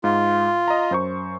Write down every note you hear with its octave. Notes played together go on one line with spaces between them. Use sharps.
G#2 F4
D#5 A#5
F#2 C5 C#6